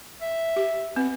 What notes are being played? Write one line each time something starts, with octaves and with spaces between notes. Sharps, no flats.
E5
G4
B3 C4